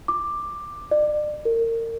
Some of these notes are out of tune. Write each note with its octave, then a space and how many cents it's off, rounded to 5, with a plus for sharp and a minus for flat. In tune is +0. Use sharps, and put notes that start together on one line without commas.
D6 +10
D5 +35
A#4 -30